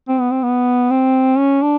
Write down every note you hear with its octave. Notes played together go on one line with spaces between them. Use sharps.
C4
B3
C4
B3
C4
C#4
D4